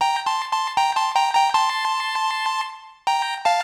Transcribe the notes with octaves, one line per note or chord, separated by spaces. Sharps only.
G5 A#5
A5 C6
A5 C6
G5 A#5
A5 C6
G5 A#5
G5 A#5
A5 C6
G5 A#5
F5 A5